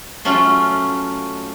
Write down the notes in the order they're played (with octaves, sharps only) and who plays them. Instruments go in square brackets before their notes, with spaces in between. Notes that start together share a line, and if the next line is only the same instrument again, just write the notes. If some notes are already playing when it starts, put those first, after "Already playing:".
[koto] F#3 A3 C#4 F4